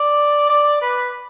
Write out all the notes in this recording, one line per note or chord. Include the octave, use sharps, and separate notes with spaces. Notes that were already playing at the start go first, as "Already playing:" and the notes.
Already playing: D5
D5
B4